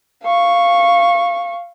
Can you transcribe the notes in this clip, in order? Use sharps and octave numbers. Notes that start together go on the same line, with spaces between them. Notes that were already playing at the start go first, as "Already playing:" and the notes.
F5 C#6